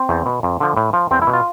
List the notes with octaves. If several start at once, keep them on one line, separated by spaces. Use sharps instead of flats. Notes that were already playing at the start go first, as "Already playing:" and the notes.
Already playing: C4
E2
B2
F2
D3 F3
A2
F3
E2 C4
E4
B2
F4